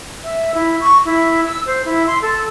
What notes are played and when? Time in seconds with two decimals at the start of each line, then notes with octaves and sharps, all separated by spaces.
0.24 E5
0.55 E4
0.81 C#6
1.05 E4
1.45 E6
1.66 C5
1.85 E4
2.07 C6
2.22 A4